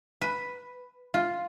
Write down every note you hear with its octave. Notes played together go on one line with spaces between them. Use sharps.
B4
F4